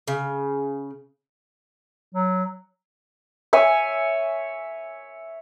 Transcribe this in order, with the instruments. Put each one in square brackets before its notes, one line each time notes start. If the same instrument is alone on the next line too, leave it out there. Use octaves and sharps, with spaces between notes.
[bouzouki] C#3
[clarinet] F#3
[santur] C#5 E5 G#5